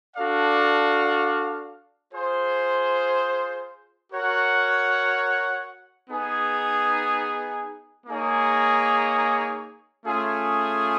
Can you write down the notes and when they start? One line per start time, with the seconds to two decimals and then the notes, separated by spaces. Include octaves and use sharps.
0.16 D4 F#4 A4 D5 F5
2.14 F4 G#4 C5
4.11 F#4 A#4 C#5 F#5
6.09 B3 D#4 G#4
8.06 A#3 D#4 G#4 C#5
10.04 A3 C#4 F4 G#4